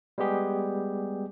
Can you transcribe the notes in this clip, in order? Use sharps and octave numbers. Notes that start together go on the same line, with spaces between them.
G3 G#3 B3 G4 G#4